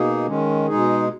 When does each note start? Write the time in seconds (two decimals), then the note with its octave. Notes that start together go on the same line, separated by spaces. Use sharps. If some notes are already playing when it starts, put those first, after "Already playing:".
Already playing: B2 A#3 D#4 G#4
0.27 D#3 G#3 C#4
0.67 B2 G#3 D#4 G#4